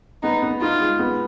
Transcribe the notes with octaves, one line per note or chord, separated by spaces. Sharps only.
B3 D#4
B3
D#4 F4
G#3
B3